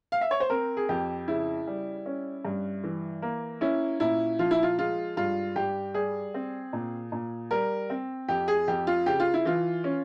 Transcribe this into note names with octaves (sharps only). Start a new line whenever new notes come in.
F5
E5
C#5
C5
C4 A#4
G#4
F2 G4
C#3 E4
G3
C#4
G2
E3
A#3
C#4 E4
A#2 E4
F3 F4
E4
F4
G#3 F4
G2 F4
G2 G4
G3 G#4
C4
A#2
A#2
G3 A#4
C4
F2 G4
G#4
F2 G4
F4
C#3 G4
F4
E4
E3 F4
C#4